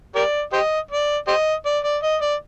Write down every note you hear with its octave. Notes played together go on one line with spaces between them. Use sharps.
G4 A#4 D5
G4 C5 D#5
D5
G4 C5 D#5
D5
D5
D#5
D5